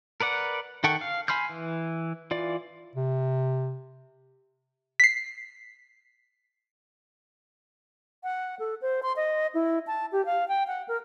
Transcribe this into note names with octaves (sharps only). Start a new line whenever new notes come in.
A#4 B4 D5 F#5
D#3 A4 F#5 G5 C#6
F5
G#5 B5 C6 F6 G6
E3
E3 F4 D5
C3
B6 C7
F#5
A4
C5
C6
D#5
E4
A5
G4
F5
G5
F#5
A#4